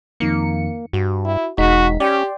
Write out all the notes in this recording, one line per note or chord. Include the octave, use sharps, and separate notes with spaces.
F2 D#3 A#3 C#7
G2 F#4
E4
E1 G#3 D#4 F#4 B6
C#4 G4 D5 G5 C6